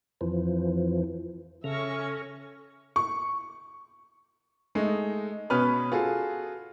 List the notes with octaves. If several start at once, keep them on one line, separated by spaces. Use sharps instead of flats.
F2 E3 F3
C#3 C#4 A4 E5 C#6 F6 A#6
C#6
G#3 A3 D#4
B2 B3 C#4 B4 F6
F4 F#4 G#4 A4